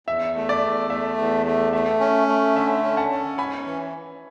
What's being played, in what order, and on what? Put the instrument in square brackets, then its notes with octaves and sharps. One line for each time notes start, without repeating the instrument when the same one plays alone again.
[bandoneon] E2 [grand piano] E5
[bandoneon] A3
[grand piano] D5
[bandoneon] E2
[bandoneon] A3 [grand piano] E5
[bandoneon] E2
A3
[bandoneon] A3 [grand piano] E5
[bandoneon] C#4
A3
[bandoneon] D3 [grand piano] E5
[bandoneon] C#4
[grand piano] F#5 A5
[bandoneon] C#4
[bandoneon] G#2 [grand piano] G#5 B5
[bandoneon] E3